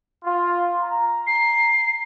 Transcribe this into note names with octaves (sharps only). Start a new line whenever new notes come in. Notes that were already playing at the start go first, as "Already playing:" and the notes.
F4
A#5
C7